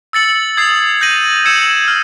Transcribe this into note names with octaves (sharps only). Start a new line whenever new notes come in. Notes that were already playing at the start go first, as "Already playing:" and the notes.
E6 A6 C#7 F#7
D#6 G#6 C7
G6 A#6 D#7 F#7
E6 G#6 C#7 E7
F6